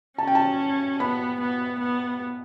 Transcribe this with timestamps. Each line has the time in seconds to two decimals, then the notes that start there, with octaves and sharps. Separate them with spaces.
0.18 C#4 A5
0.27 G5
0.35 A5
1.00 B3 B5
1.40 B3
1.80 B3